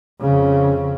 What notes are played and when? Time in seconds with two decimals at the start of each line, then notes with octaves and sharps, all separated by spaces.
0.20 F2 C#3